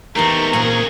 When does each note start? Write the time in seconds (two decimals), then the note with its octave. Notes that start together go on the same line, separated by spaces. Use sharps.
0.16 E2 A3 C4 D#4 G4 A#4 A#5 C#6
0.53 C#2 A#2 C4 G#4